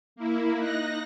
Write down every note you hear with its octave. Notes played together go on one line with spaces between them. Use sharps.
A#3 E4
D#4 F#6 A#6